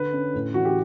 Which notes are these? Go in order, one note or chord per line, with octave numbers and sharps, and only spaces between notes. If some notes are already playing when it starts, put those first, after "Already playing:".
Already playing: D3 B4
C#4
A2
E3 F#4
G4